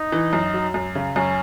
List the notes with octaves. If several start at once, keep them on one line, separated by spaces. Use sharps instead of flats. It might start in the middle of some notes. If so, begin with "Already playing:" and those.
Already playing: D#4
E3
F#2
F#3
F#2
C#3
F#2 C#4